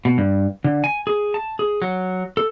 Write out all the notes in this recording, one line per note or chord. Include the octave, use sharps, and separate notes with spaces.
B2
G2
D3
G#5
G#4
A5
G#4
F#3
A4